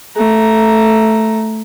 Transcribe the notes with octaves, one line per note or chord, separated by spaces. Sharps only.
A3 A#5